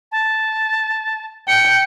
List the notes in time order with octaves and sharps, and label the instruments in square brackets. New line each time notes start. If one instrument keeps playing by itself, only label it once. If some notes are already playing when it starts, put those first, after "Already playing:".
[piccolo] A5
[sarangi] G5 [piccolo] C#7